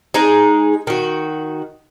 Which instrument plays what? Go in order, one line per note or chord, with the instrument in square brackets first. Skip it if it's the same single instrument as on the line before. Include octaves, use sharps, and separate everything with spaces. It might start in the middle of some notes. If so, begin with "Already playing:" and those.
[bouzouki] G#3 D#4 G#4
D#3 F#4